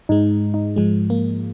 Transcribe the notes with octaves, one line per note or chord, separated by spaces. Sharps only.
G#2 G#3 D#4
D#4
G#2 F3 G#3
A#3